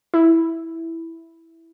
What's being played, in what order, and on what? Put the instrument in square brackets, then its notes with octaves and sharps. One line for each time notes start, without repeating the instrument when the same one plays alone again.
[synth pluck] E4